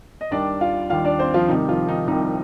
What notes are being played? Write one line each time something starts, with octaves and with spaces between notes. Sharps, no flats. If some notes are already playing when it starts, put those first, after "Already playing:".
D#5
D#2 D#3 G3 D4 D5
F4 F5
D#2 D#3 G3 F4 F5
D4 D5
C4 C5
F3 F4
C2 C3 D#3 G3 D#4
F3 F4
D#3 D#4
C2 C3 D#3 G3 D#4